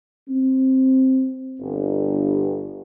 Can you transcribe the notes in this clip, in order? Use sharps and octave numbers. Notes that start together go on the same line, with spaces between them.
C4
G1